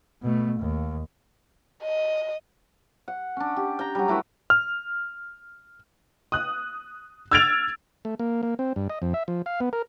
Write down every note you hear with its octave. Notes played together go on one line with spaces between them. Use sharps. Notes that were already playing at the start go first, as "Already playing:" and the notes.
B2 A3
D#2
D#5
F#5
C#4 D4
G4
G5 A#5
F#3 G3
A3 E4 F#4 B4
F6
D#6 F#6
E6 F6 G#6 A6 D7 F7
A3
A#3
A#3
C4
G2
D#5
F2
E5
F3
F5
B3
A#4